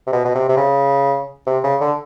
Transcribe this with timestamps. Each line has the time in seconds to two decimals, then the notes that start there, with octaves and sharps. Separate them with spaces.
0.07 C3
0.12 B2
0.25 B2
0.35 C3
0.48 C3
0.57 C#3
1.47 C3
1.64 C#3
1.81 D3